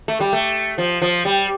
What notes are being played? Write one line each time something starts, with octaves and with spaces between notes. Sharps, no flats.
A3
G3
A3
F3
F3
G3